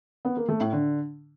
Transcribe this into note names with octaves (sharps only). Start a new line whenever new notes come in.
B3
A#3
A3
A2
D3